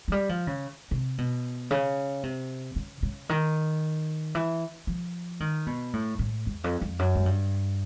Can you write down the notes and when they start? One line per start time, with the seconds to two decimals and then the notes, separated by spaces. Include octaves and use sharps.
0.08 F#3
0.12 G3
0.29 F3
0.47 C#3
0.91 C3
1.18 B2
1.71 C#3
2.23 C3
2.76 C#3
3.03 C#3
3.29 D#3
4.35 E3
4.87 F3
5.40 D#3
5.66 B2
5.93 A2
6.19 A2
6.47 E2
6.64 F2
6.81 F2
6.99 F#2
7.15 G#2
7.26 G2